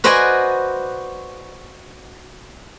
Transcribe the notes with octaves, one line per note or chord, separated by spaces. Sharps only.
F#4 B4 C5 D5 D#5 G#5